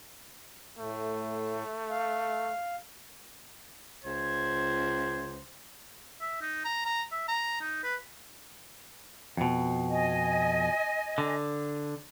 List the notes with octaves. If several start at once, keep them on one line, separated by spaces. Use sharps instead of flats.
A2 A3
F5
C#2 C5 G#6
E5
D#4
A#5
A#5
E5
A#5
D#4
B4
F2 B2
D#5 G#5
D3